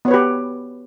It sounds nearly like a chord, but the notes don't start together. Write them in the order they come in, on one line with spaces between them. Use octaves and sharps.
B3 C#5 B4 G4